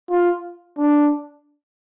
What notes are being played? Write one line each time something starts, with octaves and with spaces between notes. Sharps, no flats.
F4
D4